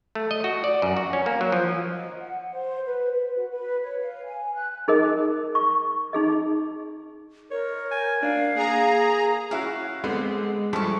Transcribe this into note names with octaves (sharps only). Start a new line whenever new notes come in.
A3
D#5
F#4
D5
F#2
F#4
C#4
A#3
F#3
F3
D#5
F#5
C5
B4
B4
F#4
B4
C#5
F5
G#5
F#6
D#4 G#4 A#4 D#5
C#6
D#4 G#4 D#5
A#4 C#5
G#5
D4 F5
A#3 G#4 A#5
C#4 E4 F#4 F5
D3 G#3 B3 C4
G2 F3 E4 A4 C#6